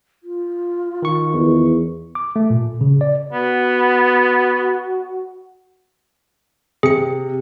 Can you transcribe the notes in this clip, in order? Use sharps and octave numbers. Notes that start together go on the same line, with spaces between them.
F4
D#3 C#6
E2
D6
A3
A#2
C#3
D5
B3 F#4
C3 G#4 C#7